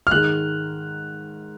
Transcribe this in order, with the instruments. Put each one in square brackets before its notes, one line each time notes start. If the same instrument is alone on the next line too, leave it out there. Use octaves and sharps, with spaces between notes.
[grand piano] F6
[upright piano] G#2 D#3 G#3 [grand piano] F#6